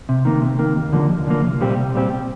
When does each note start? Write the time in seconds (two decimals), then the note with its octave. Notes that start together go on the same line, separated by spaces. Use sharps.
0.09 C3
0.25 D#3 A#3
0.42 C3
0.59 D#3 A#3
0.76 D#2
0.93 D3 F3 A#3
1.10 D#2
1.27 D3 F3 A#3
1.43 C2
1.61 A#2 G3 C4 G4
1.78 C2
1.94 A#2 G3 C4 G4